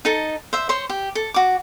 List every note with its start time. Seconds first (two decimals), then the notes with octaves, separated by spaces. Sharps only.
0.05 D#4 A4 A5
0.53 C5 E5
0.69 C5 C#5 C6
0.90 G4
1.15 A4
1.34 F#4 D6